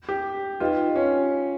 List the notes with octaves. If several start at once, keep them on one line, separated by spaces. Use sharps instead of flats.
G4
D#4 F4 G4 B4 D#5 G5
C#4